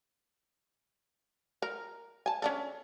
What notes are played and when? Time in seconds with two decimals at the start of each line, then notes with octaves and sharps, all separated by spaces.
1.62 A#4
2.26 G#5 A5
2.42 C#4 D4 A4